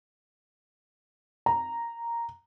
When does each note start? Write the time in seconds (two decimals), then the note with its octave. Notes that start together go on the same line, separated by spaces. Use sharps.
1.46 A#5